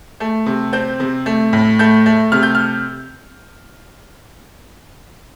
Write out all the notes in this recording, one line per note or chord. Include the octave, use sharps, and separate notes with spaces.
A3
C3
C4 G6
C3
A3
A2
A3 G6
A3
C3 F6
G6
F6